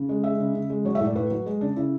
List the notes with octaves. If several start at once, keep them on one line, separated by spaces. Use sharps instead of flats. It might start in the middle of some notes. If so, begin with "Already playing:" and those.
Already playing: C#3
G#3
G#3 E5
C#3
C#3
G#3
F#3 C#5
E5
A2
D5
A2 B4
F#3 B4
G#3
C#3 D4
C#3 E4